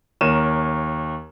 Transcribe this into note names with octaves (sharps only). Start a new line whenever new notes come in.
D#2 A#4 C#5 D#7 E7